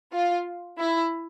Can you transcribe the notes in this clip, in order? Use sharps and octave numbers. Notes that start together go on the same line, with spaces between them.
F4
E4